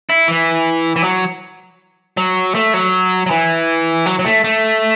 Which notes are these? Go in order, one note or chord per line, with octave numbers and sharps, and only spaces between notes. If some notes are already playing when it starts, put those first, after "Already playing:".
E4
E3
E3
F#3
F#3
A3
F#3
F#3
E3
F#3
F#3
A3
A3